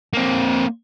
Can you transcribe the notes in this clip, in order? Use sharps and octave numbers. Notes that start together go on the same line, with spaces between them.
A#3 C4